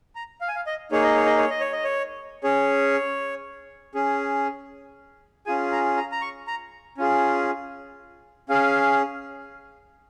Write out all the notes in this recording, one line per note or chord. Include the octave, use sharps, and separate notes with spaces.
A#5
F5
G#5
F5
D#5
A#3 D#4 G#4 C#5
D#5
C#5
D#5
C#5
D#5
C#5
D#5
C#5
C#4 G#4 C#5
C#4 G#4
C#4 F4 G#4 G#5
A#5
A#5
A#5
C#6
A#5
C#4 F4 G#4
C#4 G#4 F5